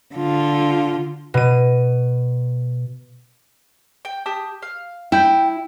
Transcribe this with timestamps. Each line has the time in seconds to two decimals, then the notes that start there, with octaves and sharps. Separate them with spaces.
0.15 D3 F4
1.34 B2 D#7
4.05 G5
4.26 G4 A5 D#6
4.62 F5
5.12 E4 G5 G6